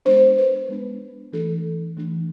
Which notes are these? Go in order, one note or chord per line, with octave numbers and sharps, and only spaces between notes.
G#3 B3 D4 C5
B4
G#3 B3 D4
E3 A3 D4 A4
E3 A3 D4